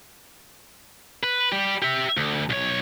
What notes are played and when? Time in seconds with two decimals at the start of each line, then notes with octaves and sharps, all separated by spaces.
1.23 B4
1.52 G3 G4
1.82 G4 E5
2.17 D2
2.50 B1 C#5